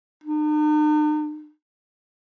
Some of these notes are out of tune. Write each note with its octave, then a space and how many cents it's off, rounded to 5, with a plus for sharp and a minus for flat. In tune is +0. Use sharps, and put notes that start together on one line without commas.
D#4 -45